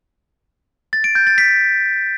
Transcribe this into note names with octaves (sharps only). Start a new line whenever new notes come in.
A6
D7
G6
A6
B6